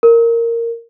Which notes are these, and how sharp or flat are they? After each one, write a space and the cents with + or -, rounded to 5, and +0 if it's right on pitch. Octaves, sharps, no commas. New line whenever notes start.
A#4 -10